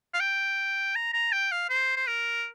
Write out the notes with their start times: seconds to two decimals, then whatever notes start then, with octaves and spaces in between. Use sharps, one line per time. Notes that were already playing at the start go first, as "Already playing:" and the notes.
0.14 F5
0.20 G5
0.95 A#5
1.14 A#5
1.32 G5
1.52 F5
1.69 C5
1.97 C5
2.07 A#4